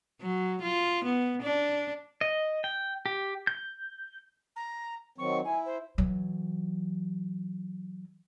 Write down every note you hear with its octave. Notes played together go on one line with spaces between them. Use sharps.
F#3
F4
B3
D4
D#5
G5
G4
G6
A#5
D#3 F#3 C4 C#6
E4 G#5
C5
E3 F#3